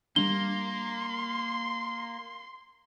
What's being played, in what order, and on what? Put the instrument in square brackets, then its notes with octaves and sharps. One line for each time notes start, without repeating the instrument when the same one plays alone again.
[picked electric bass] G3 G#3 D4 [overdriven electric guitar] A#3 [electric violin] C6 [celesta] G7